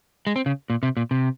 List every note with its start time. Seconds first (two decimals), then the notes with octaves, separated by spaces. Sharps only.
0.27 G#3
0.36 C4
0.46 C#3
0.70 A#2
0.83 C3
0.97 A#2
1.11 C3